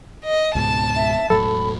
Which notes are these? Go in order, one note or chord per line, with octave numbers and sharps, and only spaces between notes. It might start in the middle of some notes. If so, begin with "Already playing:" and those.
D#5
C#2 G#2 B2 A5
E5
E1 A2 F#3 A4 B5